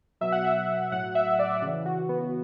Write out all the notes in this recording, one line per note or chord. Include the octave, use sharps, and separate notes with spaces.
B2 F#3 E5
F#5
E5
A2 F#3 F#5
E5
D5
C#3 E3
F#4
B3